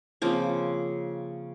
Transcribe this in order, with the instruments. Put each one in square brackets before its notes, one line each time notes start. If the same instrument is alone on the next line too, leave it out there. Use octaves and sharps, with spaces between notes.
[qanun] C#3 F3 A#3 C4